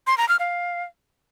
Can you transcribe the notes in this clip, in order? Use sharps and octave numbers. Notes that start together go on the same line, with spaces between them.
C6
A#5
F6
F5